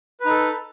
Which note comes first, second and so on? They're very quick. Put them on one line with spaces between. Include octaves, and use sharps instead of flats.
B4 D#4 A4